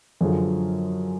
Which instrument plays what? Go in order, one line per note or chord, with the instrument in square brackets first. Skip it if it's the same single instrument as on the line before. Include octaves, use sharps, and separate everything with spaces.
[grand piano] F#2 D3 F3 G#4